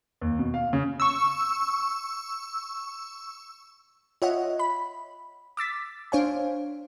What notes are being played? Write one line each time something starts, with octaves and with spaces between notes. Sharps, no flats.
D#2
B2
F5
C#3
C#6 E6
F4 C#5 D#5 E5 F#5
B5
D6 E6 A6 B6
D4 C5 C#5 F5 G#5